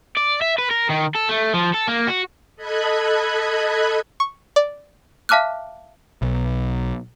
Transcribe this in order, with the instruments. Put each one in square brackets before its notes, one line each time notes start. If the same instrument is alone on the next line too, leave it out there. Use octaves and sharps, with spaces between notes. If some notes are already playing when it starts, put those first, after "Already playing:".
[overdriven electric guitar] D5
E5
B4
A#4
D#3
A4
A3
F3
A4
A#3
F#4
[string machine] A4 D#5 B5 F#6 G#6
[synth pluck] C#6
D5
[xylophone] E5 F5 A5 D6 F6 F#6
[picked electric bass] B1